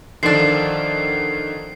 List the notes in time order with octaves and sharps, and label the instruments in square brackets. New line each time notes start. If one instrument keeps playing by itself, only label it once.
[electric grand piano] D3 D#3 A4 [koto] F3 D4 [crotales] C7